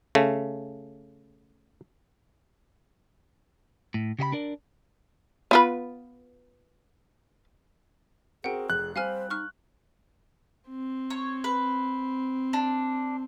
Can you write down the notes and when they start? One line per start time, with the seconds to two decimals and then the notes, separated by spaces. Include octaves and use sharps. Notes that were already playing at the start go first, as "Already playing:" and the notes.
0.15 C#3 A3
3.94 A2
4.19 C#3 G4 D#5 B5
4.32 D4 A#4 D5
5.51 B3 F4 B4
8.44 C4 F#4 G#4 A#4 F#5 G5
8.70 F1 G#4 F#6
8.96 G3 C4 G4 C5 F5 G#5 F6
9.30 D#4 C#6 F6
10.69 C4
11.10 C#5
11.44 B4
12.53 D4